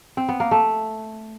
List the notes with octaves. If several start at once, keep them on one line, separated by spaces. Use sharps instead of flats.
C4
B3
A#3
A3